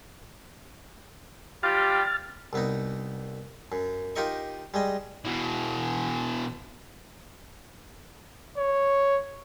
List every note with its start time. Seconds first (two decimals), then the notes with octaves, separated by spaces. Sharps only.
1.63 G3 F4 G4 F6 A6
2.53 C2 B3 D#4
3.72 F#2
4.16 D#4 F4 G4 A#4 D#5 C#6
4.74 G3 G#3 D#5
5.25 B2 E3
8.57 C#5